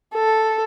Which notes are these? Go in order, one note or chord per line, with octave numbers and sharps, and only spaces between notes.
A4